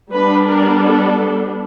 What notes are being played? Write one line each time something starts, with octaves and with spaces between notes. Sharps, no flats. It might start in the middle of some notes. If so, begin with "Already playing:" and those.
G3 B3 D4 B4
A#4
A4